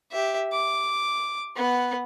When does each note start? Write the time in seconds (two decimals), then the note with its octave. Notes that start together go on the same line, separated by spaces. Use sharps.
0.12 G4 E5
0.53 D6
1.56 B3 F#5